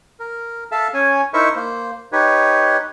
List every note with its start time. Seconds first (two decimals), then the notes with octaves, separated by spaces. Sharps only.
0.20 A#4
0.72 A4 E5 F5 A5
0.94 C#4 C#5 G#5
1.34 D#4 E4 A#4 C5 E5 C#6
1.56 A#3 C5
2.12 D#4 G4 B4 C#5